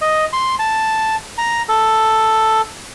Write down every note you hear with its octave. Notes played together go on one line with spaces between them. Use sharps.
D#5
C6
A5
A#5
A4